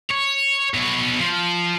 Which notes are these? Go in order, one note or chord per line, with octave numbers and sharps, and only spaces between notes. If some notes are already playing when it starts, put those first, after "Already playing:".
C#5
B2 C#5
F3